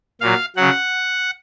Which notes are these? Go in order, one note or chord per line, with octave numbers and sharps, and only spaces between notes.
A#2 F#3 F5
C#3 F#3 F#5